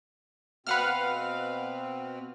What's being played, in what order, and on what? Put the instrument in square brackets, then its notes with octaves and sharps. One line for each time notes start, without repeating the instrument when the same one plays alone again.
[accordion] B2 C4 [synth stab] B4 F#5 F6 [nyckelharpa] F5